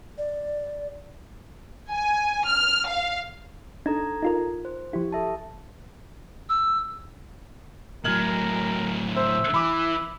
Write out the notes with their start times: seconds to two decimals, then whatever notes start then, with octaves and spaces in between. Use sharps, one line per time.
0.18 D5
1.91 G#5
2.46 F6
2.88 F5
3.86 D4 D#4 A4 A#5 G#6
4.23 D#4 F4 A#4
4.65 C5
4.93 F3 E4 G4
5.12 A4 E5 A5
6.49 E6
8.04 A2 F#3 A#4 F6 G#6 F#7
9.16 C5 E5
9.54 E3 B5 D6